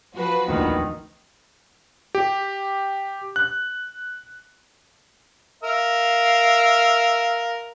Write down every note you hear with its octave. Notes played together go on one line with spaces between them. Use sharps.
F3 F#4 B4
D1 A#1 E2 D#3
G4
F#6
A#4 E5 F5